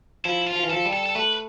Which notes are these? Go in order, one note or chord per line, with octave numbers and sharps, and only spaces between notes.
F3 E4
F4
F3
E3
F3 A4
G3
A4
A4
A3 B4